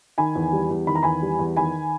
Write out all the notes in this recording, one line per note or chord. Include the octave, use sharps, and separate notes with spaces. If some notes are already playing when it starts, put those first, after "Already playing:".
D#3 G#5 B5
E2
G3
E2
D#3 B5
A#5
E2 G#5 B5
G3
E2
D#3 G#5 B5